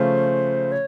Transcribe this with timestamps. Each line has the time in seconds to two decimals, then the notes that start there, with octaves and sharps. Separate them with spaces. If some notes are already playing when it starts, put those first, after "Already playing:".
Already playing: C#3 F3 A3 C#4 F4 C5
0.72 C#5